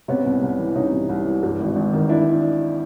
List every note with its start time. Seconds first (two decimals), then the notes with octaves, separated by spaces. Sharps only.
0.08 C3 B3 C#4
0.25 C2
0.42 C2
0.59 E3
0.75 C3 C#4 D#4
0.92 C2
1.09 C2
1.26 E3
1.43 G2
1.60 G#1
1.76 G#1
1.93 D#3
2.09 D4 E4